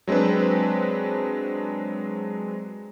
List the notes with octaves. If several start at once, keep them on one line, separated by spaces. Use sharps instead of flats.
F#3 G#3 C4 D4 B4